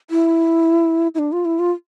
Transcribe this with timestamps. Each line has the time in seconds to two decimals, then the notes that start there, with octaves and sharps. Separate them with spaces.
0.11 E4
1.15 E4
1.19 D4
1.32 F4
1.45 E4
1.59 F4